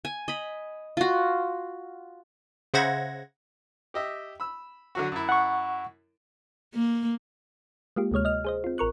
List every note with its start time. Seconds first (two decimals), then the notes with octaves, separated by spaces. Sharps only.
0.05 G#5
0.28 D#5 B5
0.97 F4 F#4
2.74 C#3 C5 E5 F#5 G#6 A#6
3.94 G4 D#5 E5
4.40 B5 E6
4.95 D3 F#3 F#4
5.12 F#2 E4
5.29 F#5 C#6
6.75 A#3
7.96 G#3 A#3 F4 G4
8.11 D2 C3 G#3 C#5 F6
8.25 D#5 F6
8.45 G#4 C5 D#5
8.64 C4 F4
8.78 A1 A#4 C#6 F#6